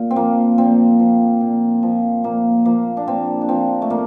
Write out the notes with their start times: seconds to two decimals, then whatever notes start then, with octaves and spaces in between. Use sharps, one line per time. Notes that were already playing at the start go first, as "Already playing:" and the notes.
Already playing: A#2
0.11 C4
0.16 F3 A#3
0.58 A#2 C4
0.99 F3
1.41 A#2
1.83 F3
2.24 A#2 A#3
2.65 F3 A#3
2.97 D4
3.08 A#2 C4
3.41 D4
3.49 F3 C4
3.82 A3
3.90 A#2 A#3